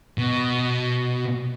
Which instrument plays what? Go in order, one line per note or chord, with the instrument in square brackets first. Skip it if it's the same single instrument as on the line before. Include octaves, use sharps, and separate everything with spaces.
[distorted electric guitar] B2